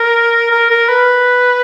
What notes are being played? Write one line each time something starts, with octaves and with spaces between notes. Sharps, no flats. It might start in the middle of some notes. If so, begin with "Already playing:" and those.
Already playing: A#4
A#4
A#4
B4